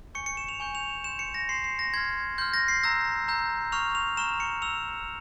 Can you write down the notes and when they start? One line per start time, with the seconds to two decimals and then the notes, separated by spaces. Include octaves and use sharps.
0.15 G#5 C#6 G6 C#7
0.26 C#7
0.37 E7
0.49 F7
0.60 G#5 C#6 G6
0.75 F7
0.90 E7
1.04 C6 G6 E7
1.19 C#7
1.34 A#6
1.49 C6 C7
1.53 G6
1.64 C7
1.79 A#6
1.94 C6 F6 G#6
2.38 C6 F6 G6
2.54 A#6
2.68 C7
2.83 A#5 E6 G6 A#6
3.28 A#5 E6 G6
3.72 A#5 C#6 F6 F7
3.95 F7
4.17 A#5 C#6 F6 E7
4.40 C#7
4.62 A#5 C#6 E6 F7